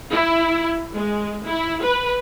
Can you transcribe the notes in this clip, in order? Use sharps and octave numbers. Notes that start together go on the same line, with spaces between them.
E4
G#3
E4
B4